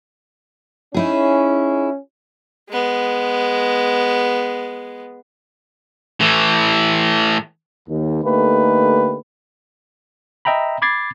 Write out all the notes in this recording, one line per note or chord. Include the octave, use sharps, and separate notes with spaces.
C#4 D#4 E4 G#4
G#3 B3
A2 E3
D#2
D3 A3 A#3 D#4 G4 B4
D#5 E5 G5 A#5 B5
B5 D6 G#6 A6 C7